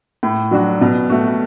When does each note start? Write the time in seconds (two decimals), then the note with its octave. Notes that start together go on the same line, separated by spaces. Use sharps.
0.23 A2
0.51 F#3 D4 F#4
0.81 B2
1.10 A3 F#4